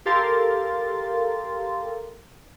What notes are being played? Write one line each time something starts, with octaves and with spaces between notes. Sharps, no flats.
G4 A4 A#4 F5 C6 A6